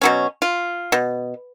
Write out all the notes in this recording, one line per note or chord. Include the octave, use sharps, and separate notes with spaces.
B2 F#3 C#4
F4
B2